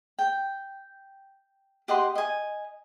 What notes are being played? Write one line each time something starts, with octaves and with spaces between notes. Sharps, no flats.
G5
G4 D#5 F#5 C6
D#5 G#5